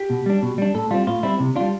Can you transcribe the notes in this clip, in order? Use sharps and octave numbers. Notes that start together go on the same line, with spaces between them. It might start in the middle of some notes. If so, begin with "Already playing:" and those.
Already playing: G4
B2
G3 D4
B2
G3 D4
A2 A4
G3 C4 F4
A2 F4
G3 C4 E4
C3
G3 D4 F4